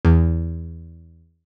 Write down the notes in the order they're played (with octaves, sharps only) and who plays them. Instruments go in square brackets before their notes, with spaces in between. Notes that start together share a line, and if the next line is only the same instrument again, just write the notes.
[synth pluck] E2